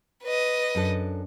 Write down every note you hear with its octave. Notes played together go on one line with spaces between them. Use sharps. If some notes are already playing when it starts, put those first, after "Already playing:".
B4 D#5
F#2 D4 A4